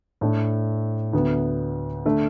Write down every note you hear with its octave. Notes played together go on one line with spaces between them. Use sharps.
A2 A3 D4
D2 D3 B3
D3 A3